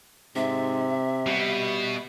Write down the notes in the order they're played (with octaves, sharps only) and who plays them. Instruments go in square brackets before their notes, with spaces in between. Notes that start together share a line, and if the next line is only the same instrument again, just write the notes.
[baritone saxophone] G#2 [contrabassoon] C3 [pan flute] E5
[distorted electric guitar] B2 [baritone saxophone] G3